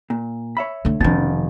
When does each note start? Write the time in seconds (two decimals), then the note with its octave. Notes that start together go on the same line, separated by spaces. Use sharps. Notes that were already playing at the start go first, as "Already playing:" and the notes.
0.10 A#2
0.57 C#5 E5 B5
0.85 D3 A3
1.00 F1 B2 D#3 C#4 D4 A6